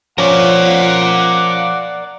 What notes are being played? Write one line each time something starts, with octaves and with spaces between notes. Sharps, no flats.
F3 C#4 A#4 D5 F#5